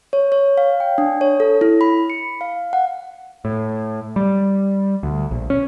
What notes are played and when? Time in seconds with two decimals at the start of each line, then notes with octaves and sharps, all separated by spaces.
0.13 C#5
0.32 C#5
0.57 F5
0.80 G5
0.98 D4
1.21 C#5
1.40 A4
1.61 E4
1.81 B5
2.10 C#7
2.41 F5
2.73 F#5
3.45 A2
4.16 G3
5.03 D2
5.31 A#1
5.50 C#4